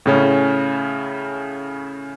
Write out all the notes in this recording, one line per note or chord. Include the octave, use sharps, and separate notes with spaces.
A2 C#3 C#4